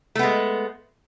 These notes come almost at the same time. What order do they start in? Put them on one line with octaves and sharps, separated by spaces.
A3 B3 G#3